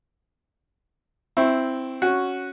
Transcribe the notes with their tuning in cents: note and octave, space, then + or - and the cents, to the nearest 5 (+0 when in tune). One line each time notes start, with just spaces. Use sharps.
C4 +0 E4 +0 C#6 -35
C#4 +0 F#4 -5